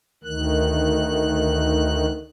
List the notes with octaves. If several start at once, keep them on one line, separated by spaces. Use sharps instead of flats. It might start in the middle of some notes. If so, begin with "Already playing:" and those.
D2 D#3 F#6